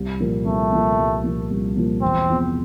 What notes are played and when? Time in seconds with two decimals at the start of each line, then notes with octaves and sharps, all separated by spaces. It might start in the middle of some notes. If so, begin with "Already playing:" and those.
Already playing: C2
0.20 A#2 F3 A#3
0.46 C2 A3
0.72 A#2 F3 A#3
0.98 C2
1.24 A#2 F3 A#3
1.51 C2
1.77 A#2 F3 A#3
2.02 E1 C4
2.29 E2 C3 F3